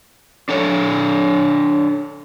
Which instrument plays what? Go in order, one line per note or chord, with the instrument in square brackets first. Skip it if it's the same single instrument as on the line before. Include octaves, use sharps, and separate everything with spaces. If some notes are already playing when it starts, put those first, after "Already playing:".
[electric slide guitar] D4 A4 C#5 D5